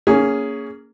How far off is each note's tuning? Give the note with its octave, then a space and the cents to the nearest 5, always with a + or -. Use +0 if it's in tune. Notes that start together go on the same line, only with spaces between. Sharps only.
A#3 -15 C#4 +15 G#4 +0